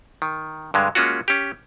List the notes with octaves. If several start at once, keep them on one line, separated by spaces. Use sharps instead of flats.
D#3
G2 D3 G#3
G#3 A#3 C#4 F4 F#4
C#4 G4